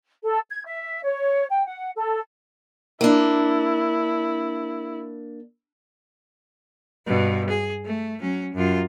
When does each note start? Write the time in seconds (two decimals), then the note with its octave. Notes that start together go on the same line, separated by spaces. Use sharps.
0.22 A4
0.49 G#6
0.63 E5
1.03 C#5
1.48 G5
1.67 F#5
1.94 A4
3.01 A#3 D4 E4
7.07 G2 B2
7.50 G#4
7.85 A3
8.20 F#3 C#4
8.54 F#2 F4